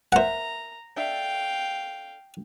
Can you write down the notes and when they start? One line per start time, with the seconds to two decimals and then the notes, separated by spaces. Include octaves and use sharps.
0.12 A#4 C5 E5 F#5 A#5
0.96 D4 A4 E5 F5 G5